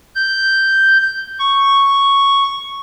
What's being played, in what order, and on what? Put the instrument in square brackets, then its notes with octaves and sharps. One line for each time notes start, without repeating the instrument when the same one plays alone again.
[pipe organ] G6
C#6